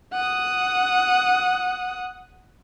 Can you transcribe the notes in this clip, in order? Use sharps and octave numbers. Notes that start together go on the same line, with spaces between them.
F#5 D#6